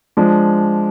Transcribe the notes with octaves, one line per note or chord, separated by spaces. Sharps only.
F3 G#3 D4